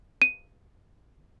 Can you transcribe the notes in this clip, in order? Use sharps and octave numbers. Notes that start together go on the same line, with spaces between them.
D#7